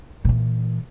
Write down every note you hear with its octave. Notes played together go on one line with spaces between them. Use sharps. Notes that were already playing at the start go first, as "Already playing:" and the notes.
A#2 E3